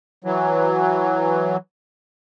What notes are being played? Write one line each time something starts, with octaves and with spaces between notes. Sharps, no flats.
E3 F#3